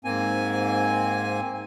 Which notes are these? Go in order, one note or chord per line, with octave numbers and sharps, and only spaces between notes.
G#2 A#3 C4 G#5